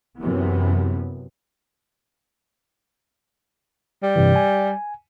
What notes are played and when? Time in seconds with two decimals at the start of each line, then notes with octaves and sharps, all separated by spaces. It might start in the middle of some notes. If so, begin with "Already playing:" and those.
0.20 F#2 C3 E3 B3
4.03 G3
4.16 G2 C3 E3
4.36 G#5